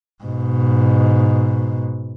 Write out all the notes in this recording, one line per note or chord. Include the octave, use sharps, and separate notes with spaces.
G#2 B2